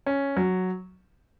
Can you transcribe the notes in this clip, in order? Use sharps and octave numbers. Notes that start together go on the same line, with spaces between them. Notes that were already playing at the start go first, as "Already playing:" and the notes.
C#4
F#3